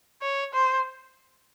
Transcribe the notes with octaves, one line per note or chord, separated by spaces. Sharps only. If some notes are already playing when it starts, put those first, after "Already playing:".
C#5
C5